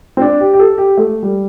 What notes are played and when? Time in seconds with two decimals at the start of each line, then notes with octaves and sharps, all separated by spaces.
0.17 C4
0.21 D4
0.40 G4
0.54 G4
0.59 A4
0.78 G4
0.97 A3
1.23 G3